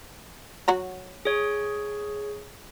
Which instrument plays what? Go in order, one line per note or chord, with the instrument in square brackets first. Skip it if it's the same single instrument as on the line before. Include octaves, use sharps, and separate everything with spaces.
[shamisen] F#3 F#4 A#5
[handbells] G#4 C#5